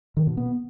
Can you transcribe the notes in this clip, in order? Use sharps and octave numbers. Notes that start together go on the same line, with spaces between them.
D#3
B2
B3